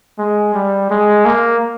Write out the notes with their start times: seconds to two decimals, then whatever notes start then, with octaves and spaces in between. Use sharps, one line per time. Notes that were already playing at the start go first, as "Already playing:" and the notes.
0.18 G#3
0.54 G3
0.90 G#3
1.25 A#3